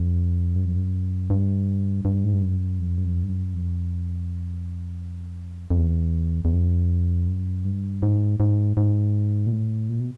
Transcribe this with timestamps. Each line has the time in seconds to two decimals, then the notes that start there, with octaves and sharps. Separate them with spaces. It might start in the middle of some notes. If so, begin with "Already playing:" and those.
Already playing: F2
0.56 F#2
0.65 F2
0.76 F#2
1.30 G2
2.05 G2
2.24 G#2
2.33 G2
2.42 F#2
2.79 F2
2.98 F#2
3.05 F2
3.23 G2
3.29 F#2
3.54 F2
5.70 F2
5.78 E2
6.45 E2
6.53 F2
7.28 F#2
7.65 G2
8.02 G#2
8.40 G#2
8.77 G#2
9.46 A#2
9.52 A2
9.89 A#2
10.00 B2